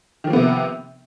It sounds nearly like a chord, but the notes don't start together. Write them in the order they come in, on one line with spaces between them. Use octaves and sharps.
D#3 F3 A#3 B3 C3